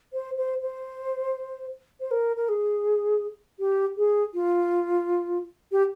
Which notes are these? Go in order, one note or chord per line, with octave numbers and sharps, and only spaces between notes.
C5
C5
C5
C5
A#4
A#4
G#4
G4
G#4
F4
G4